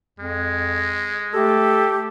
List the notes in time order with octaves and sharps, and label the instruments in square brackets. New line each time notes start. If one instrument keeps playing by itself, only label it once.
[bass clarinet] F2 [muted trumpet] G#3
[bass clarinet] A3 [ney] G4 [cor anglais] A4